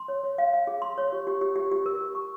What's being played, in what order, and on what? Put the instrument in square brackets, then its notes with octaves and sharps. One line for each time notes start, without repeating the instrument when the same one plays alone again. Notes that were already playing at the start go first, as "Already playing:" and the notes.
Already playing: [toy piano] C6
C#5
C#5
F5
F5
G#4
C6
C#5
G4
G4
G4
G4
G4
A#4
G4
C#6